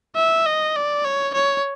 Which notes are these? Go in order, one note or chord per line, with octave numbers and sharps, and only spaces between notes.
E5
D#5
D5
C#5
C#5